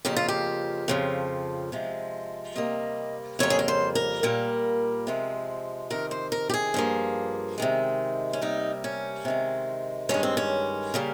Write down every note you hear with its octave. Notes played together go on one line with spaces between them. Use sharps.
F2 C#3 F3 A#3 G4
F4
G4
F2 C#3 F3
C3 F3 G#3
C3 G3 A#3 D#5
F2 C#3 G3 A#3 C#5
G#4
A#4
C5
A#4
A#2 G3 A#3
C3 F3 G#3
F2 C3 D#3 A#4
C5
A#4
G4
G#4
G2 F3 A#3
C3 D#3 G#3
C#4
C3 G3 A#3 D#4
C#4
C3 D#3 G#3
G2 D#3 G#3 C#4
C4
C#4
C#3 G3 A#3